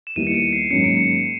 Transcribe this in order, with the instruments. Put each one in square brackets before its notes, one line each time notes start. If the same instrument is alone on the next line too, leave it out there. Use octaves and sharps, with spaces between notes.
[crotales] E7
[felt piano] D#2 D#3 G3 B3 E4 [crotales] D#7
[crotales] C#7
D7
C7
[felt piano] G#2 D#3 F#3 A#3 C#4 [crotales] C#7
[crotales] D7
C#7